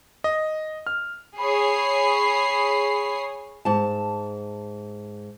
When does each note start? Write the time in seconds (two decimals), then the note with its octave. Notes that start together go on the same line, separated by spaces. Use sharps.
0.24 D#5
0.87 F6
1.38 G#4 C#5 B5 C7
3.65 G#2 A5